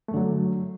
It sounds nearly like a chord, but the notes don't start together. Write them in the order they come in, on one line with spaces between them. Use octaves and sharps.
A3 F#2 D3 F#3